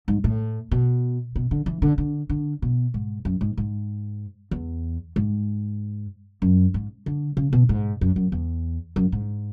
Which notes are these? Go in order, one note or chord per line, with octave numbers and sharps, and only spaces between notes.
G#2
A2
B2
B2
D3
E3
D3
D3
D3
B2
G#2
F#2
G#2
G#2
E2
G#2
F#2
G#2
D3
C#3
B2
G#2
F#2
F#2
E2
F#2
G#2